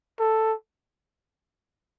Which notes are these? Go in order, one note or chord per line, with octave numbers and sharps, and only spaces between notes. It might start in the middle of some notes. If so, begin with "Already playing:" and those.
A4